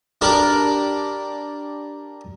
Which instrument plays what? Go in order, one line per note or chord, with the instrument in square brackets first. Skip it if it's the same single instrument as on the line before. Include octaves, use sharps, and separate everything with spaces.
[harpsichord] D4 G4 A#4 D5 B5